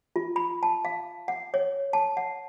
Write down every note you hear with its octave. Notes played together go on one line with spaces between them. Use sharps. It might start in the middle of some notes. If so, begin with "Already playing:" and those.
F4
B5
A5
F5
F#5
C#5
A5
F#5